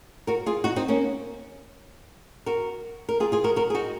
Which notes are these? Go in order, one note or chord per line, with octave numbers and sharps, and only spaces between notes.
F#4 A#4
F4 G#4
D#4 F#4
C4 D#4
A#3 C#4
F#4 A#4
A#4
F4 G#4
F4 G#4
F#4 A#4
F#4 A#4
G#4
D#4 F#4